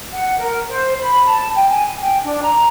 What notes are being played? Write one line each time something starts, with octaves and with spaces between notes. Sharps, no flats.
F#5
A#4
C5
B5
A5
G5
G#5
G5
D4
A#5